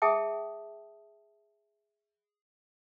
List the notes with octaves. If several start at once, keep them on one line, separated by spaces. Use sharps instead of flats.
G#4 E5 G5 A5 D#6